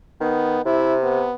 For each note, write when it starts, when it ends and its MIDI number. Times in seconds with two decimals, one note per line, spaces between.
0.21 0.60 51
0.21 0.64 59
0.65 1.27 48
0.65 0.96 64
1.03 1.35 59